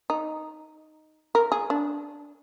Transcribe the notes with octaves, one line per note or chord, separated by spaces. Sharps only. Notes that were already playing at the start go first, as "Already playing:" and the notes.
D#4
A#4
G#4
D4